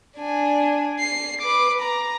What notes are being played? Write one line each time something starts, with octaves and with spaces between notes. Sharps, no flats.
D4 G#5
C7
B4 D6
A#5